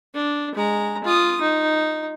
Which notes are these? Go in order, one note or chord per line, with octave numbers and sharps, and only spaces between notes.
D4
G#3 A#5
F4 D#6
D#4